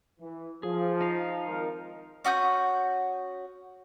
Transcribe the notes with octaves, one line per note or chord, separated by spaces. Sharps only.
E3
F3 G#4
D#4 F5
G#1 F4 A#4
C#4 F#4 D#6 G6